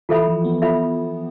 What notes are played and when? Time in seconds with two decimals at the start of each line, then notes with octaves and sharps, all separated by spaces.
0.09 E3 F4 A4 E5 B5
0.27 F3
0.44 B3
0.62 F4 A4 E5 B5